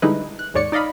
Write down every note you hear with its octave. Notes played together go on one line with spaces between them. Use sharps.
D3 G3 G#3 D#4 E4 B4
F#6
D#2 G#2 C#5 D5 C#7
D#4 D5 D#5 F5 B5